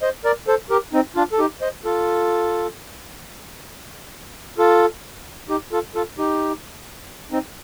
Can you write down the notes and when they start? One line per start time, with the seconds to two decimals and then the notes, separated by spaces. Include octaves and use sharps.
0.02 C5 D#5
0.25 A#4 D5
0.48 A4 C5
0.70 G4 A#4
0.93 C4 D#4
1.16 D4 F4
1.33 A4
1.39 D#4 G4
1.61 C5 D#5
1.85 F4 A4
4.58 F4 A4
5.49 D#4 G4
5.72 F4 A4
5.95 F4 A4
6.18 D#4 G4
7.32 C4 D#4